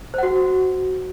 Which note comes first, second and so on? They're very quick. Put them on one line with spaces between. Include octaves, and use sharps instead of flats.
C5 F#5 F#4